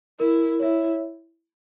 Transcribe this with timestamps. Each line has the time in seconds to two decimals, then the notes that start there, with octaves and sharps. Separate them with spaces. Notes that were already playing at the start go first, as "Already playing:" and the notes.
0.20 E4 A#4
0.60 E4 C#5 E5